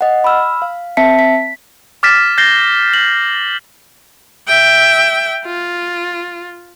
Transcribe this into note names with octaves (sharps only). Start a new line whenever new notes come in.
D#5 F#5
B5 E6 F6
F5
C4 E5 A5 B6 C#7
B6
D6 F6 A6 B6 E7
G6 A6 A#6 C7 G7
F#7
E5 G5
F4